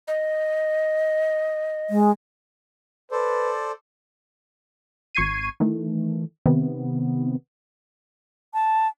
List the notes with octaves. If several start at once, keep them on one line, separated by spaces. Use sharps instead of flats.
D#5
G#3
A4 B4 C5 D5
G#1 C#6 G#6 C7 D#7
D#3 E3 A3
C3 D#3 B3
A5